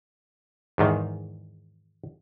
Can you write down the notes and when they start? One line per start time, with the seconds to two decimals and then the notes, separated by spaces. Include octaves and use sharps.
0.78 E2 G#2 D#3